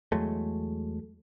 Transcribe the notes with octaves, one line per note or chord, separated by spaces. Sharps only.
E2 F#3 G#3 A3